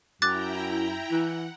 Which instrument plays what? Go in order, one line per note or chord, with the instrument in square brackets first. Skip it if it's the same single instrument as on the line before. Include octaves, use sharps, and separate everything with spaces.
[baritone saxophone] F#2 [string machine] E4 G5 A#5 [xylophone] D6 F#6 A6
[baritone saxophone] E3 [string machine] F#5